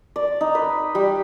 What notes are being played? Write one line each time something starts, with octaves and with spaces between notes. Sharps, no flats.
D5
D#4
B4
G3